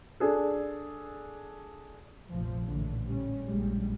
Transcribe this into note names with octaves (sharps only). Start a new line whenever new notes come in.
D4 G#4 A4
F1 A#1 F3
A#1 A2 D3 E3
G3 C#4
A#1 F#2 G3 G#3